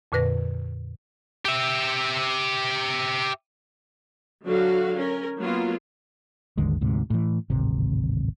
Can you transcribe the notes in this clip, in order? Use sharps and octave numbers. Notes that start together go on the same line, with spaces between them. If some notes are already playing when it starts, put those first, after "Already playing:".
F2 A#2 D3 B4 A#6
G4 E5
D3 F#3 F#4 A4 F5
C#4 A#4
F#3 A#3 B3 F4
G#1 D#2 D3 G#3
D2 G#2 C3
A2 E3
D1 G#1 C3